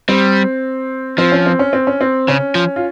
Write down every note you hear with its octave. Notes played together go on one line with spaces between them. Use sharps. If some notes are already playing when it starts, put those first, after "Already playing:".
G3 C4
F3 C4
C#4
C4
C#4
C4
C#4
C4
C#3 C#4
F3
F4